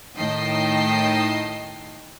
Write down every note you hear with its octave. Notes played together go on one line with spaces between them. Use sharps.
A2 D#3 D#5 G5 A5 C7